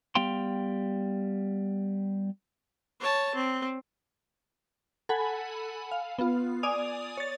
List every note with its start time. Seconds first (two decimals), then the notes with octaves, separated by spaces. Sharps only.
0.15 G3 B3 F5 G5 C6
3.00 C#5 A5
3.34 C4
5.09 A4 F#5 G#5 B5
5.92 F5
6.19 B3 F4
6.63 D5 G#5 D#6 F7
7.17 C#5 A6